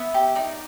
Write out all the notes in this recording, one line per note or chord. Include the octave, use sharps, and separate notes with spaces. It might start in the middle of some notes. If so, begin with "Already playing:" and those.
Already playing: B3 E5
G4
D#4 D5